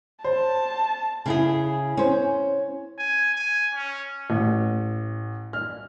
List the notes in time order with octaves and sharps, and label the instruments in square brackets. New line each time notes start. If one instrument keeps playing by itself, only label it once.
[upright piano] C5 [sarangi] A5
[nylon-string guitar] C#3 E4 G#4
C#4 C5
[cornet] G#5
G#5
C#4
[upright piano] A1
F6